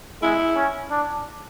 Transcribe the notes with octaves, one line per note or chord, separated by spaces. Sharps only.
G#3 E4
C#4
D4